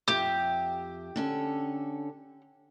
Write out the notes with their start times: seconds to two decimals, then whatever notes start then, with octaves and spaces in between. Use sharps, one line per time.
0.08 F2 G4 E5
1.16 D3 C#4 A4